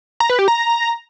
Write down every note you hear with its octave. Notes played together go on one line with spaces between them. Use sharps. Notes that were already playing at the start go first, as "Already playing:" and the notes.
A#5
B4
G4
A#5